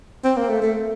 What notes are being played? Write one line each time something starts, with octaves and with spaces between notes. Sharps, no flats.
C4
A#3
A3
A3